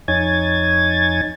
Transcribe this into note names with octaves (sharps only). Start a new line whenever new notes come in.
F2 D#4 C#5 G#5 G#6 A6